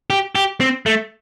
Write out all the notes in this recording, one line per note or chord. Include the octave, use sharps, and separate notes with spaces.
G4
G4
C4
A3